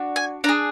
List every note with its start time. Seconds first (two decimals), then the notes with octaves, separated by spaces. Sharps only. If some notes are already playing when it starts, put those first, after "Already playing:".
Already playing: D4 F#4
0.16 G#5
0.44 D4 A#5
0.49 G#4